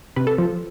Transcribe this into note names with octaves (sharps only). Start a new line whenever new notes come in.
C3 B4
A4
F3